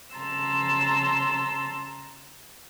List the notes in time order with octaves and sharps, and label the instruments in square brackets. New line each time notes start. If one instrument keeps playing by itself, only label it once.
[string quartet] C#3 A5 A#5 C6 E6